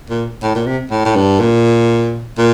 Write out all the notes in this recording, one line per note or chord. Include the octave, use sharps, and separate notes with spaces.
A#2
A2
A#2
C3
A2
A2
G2
A#2
A#2